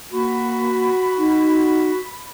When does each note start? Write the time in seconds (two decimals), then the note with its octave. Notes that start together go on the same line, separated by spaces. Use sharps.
0.12 A#3 F#4 B5
1.18 D#4